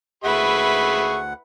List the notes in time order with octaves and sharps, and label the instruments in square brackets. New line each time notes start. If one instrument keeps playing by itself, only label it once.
[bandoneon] D2 F#5 [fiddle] E4 B4 [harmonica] G#4 E5 C#6